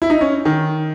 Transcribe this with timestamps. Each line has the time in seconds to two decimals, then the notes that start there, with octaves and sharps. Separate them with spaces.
0.02 E4
0.10 D#4
0.21 C#4
0.45 D#3